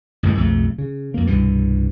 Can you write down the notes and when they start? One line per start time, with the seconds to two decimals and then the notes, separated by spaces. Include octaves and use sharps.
0.23 A1 G2 D#3 G#3
0.37 B1 F2 G#2 A3
0.78 C#3
1.14 F2 A#3
1.27 C2 G2 B2 E3